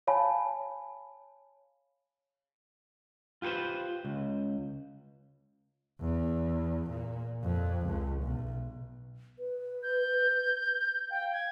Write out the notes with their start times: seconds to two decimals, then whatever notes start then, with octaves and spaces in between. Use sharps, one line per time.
0.07 C#5 F5 G#5 A5 B5
3.42 F4 G4 A4 B4 C5
4.05 C#2
6.01 E2
6.90 A#2
7.43 F2
7.86 C#2
8.23 B1
9.39 B4
9.83 G6
11.11 F5 G5
11.33 G#6